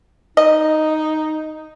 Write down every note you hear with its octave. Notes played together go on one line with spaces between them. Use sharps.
D#4 D#5